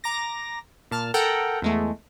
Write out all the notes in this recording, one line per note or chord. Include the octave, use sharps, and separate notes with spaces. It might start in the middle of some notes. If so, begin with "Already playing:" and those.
A#5 D6 A#6
A#2 A5 F6
A4 A#4 F#5 G5 A#5
E2 G#3 A3